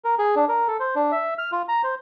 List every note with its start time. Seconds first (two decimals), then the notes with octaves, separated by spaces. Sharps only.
0.05 A#4
0.19 G#4
0.36 D4
0.49 A#4
0.68 A4
0.80 C5
0.96 D4
1.12 E5
1.38 F6
1.52 F4
1.69 A#5
1.84 C5